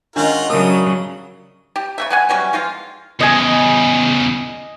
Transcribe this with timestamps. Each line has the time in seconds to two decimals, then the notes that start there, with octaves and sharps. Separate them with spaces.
0.16 D#3 G#3 C#4 D4 F4 A#4 F#5
0.50 C#3 F#3 D4 E4 A#4 D#6
1.76 G4
1.98 C#3 C4 E5
2.10 G#3 F#5 G#5
2.29 E3 F#3 G3 C#4
2.53 F3 G#3 C4 F4
3.20 E2 C#3 D#5 G#5